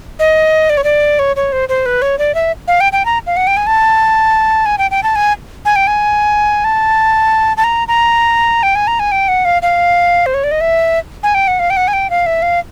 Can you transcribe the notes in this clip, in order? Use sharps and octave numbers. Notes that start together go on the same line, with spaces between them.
D#5
D5
C#5
D5
C#5
C#5
C5
C5
B4
C#5
D5
E5
F5
G5
G5
A#5
F5
F#5
G5
G#5
A5
G#5
G5
G5
A5
G#5
G#5
G5
G#5
A5
A5
A#5
A#5
G5
G#5
A#5
G#5
G5
F#5
F5
F5
C5
C#5
D5
D#5
E5
G#5
G5
F#5
F5
G5
F#5
G#5
G5
F5
E5
F5